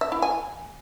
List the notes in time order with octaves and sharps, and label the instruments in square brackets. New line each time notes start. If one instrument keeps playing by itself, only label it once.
[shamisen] E5
E4
G#5